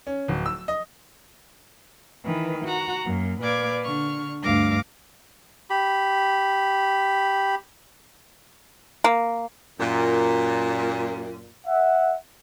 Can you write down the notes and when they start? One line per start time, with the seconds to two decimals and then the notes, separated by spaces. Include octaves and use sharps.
0.07 C#4
0.28 D1
0.46 E6
0.68 D#5
2.25 D#3 E3 B4
2.66 F#4 A#5 F#6
3.06 F#2 A#3
3.42 A#2 B4 D5 F5 D6 G#6
3.84 D3 C#6 F6
4.43 D2 G2 F5 D6 A#6
5.70 G4 B5
9.04 A#3
9.79 F#2 A#2
11.67 E5 F#5